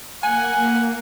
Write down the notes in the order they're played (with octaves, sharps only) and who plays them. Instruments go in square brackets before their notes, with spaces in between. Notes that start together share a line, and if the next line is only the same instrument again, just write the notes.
[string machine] A#3 [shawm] F#5 [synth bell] G#5